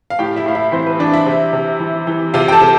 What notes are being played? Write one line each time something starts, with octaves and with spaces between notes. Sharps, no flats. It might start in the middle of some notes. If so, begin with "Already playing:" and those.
F5
A2 G4 G5
E4 E5
A2 F5
E4 E5
E3 C4 C5
B4
E3 D4 D5
E4 E5
C3
C3
E3
E3
C3 F4 F5
G5
A4 A5
C3